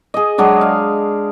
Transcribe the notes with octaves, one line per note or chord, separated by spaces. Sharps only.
G#4 D#5
F#3 G#3 D4
F5